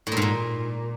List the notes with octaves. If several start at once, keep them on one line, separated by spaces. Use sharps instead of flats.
A2
A#2
G#2
A#2